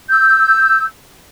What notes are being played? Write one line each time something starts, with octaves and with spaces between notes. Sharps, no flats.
E6 G6